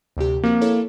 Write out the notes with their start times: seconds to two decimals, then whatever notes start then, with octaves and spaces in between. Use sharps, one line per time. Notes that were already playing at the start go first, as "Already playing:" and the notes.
0.17 D2 C3 G4
0.44 F3 A#3 C4 F#4
0.61 E4 A4 C#5